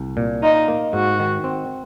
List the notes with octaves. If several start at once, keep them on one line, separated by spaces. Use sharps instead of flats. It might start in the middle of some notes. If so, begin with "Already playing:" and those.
Already playing: C2
A#2
D#4 F4
A#3
G#2 F#4
D#3
C4